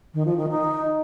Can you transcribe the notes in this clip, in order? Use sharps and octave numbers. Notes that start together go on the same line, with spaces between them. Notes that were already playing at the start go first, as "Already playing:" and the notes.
D#3
F3
D#3
D#4